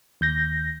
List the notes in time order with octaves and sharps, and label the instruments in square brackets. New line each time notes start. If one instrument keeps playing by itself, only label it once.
[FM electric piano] D#2 G6 A#6